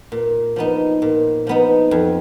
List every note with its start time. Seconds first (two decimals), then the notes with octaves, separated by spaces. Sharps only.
0.12 A#2
0.56 F3 B3 D#4
1.02 A#2
1.47 F3 B3 D#4
1.91 F2